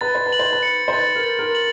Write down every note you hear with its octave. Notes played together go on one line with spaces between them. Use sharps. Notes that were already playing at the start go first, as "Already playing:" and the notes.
B4 A6
C5
B4
F#7
C5
B4
C#7
C5
B4 A6
A#4
A6
A#4
F#7